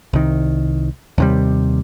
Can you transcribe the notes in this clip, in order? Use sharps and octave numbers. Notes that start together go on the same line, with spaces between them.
C2 D#3
D#2 C3 G3